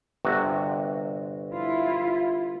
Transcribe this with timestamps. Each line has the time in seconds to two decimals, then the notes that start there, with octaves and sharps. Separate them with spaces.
0.25 G1 C3 F#4
1.54 E4 F4